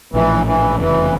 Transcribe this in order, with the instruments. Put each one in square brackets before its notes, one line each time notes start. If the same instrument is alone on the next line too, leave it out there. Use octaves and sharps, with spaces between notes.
[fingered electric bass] A#1 A2 F3 [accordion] E3
[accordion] E3
[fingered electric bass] F1 E2 C#3 [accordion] E3